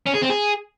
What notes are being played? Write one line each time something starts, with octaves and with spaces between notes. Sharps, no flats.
C#4
G#4
C4
G#4